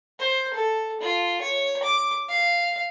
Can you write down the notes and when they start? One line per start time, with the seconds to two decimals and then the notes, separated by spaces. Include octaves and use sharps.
0.19 C5
0.54 A4
1.01 F4
1.42 C#5
1.83 D6
2.29 F5